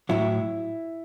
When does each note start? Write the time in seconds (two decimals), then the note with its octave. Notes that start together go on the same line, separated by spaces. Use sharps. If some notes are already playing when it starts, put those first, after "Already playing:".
0.09 A2 F#3 E4